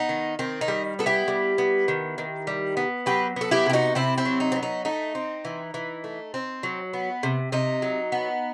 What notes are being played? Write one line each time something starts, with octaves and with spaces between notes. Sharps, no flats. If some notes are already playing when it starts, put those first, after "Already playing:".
Already playing: B3 D#4
D#3
D#3 C4
D#4
G3
B3 A4
E4 G4
G3
B3
D#3
D#3
G3
B3
F#3 G4 B4
B3 A4
E4 G4
C3 G4
D#4 F#4
C3 C4 E4
C4 E4
F#3
D#4
C4
B3
D#4
A3 D#4
C4
E3
E3
A3
C4
F#3
B3
C3
C3 D#4
F#3
B3